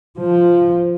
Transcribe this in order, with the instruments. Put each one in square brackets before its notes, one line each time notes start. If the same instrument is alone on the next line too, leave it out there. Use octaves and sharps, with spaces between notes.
[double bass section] F3